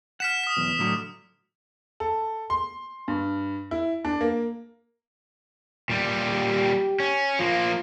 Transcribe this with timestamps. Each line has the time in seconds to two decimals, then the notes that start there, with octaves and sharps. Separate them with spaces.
0.20 F#5 F6 B6 E7
0.44 D#6 B6
0.57 B1 E2
0.79 A2 D3 F#3
2.00 A4
2.50 C6
3.08 G2
3.71 E4
4.05 D4
4.21 A#3
5.90 A#2 G3
6.30 G4
7.00 C#4
7.39 F3 A#3 F4